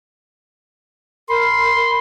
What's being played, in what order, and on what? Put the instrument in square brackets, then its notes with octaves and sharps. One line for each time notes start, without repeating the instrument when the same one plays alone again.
[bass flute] A#4 [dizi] B5 [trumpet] C6